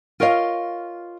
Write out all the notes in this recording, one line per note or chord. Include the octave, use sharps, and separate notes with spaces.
F4 A#4 C#5 D#5 F5